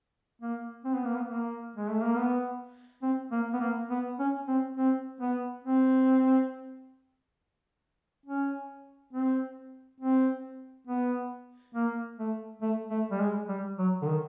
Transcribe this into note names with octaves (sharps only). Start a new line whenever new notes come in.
A#3
C4
B3
A#3
B3
A#3
G#3
A3
A#3
B3
C4
A#3
B3
A#3
B3
C#4
C4
C4
B3
C4
C#4
C4
C4
B3
A#3
A3
A3
A3
G3
G#3
G3
F#3
D3
D#3